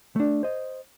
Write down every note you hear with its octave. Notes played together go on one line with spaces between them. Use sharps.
A3 D4
C5 D#5